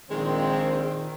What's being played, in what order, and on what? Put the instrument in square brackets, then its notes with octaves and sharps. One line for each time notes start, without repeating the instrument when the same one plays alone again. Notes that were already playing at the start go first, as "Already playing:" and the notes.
[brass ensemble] A#1 C4 [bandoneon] D#3 [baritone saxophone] G#3